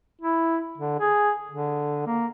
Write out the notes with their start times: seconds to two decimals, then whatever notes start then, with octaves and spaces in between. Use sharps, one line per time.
0.22 E4
0.78 D3
0.99 G#4
1.51 D3
2.07 A#3